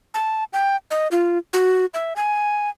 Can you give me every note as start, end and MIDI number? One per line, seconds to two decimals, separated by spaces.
0.14 0.44 81
0.53 0.76 79
0.91 1.08 75
1.11 1.38 65
1.53 1.86 66
1.94 2.13 76
2.16 2.69 80